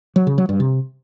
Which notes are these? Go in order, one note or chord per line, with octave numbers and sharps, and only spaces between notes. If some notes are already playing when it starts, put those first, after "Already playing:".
F#3
C#3
F#3
G2
C3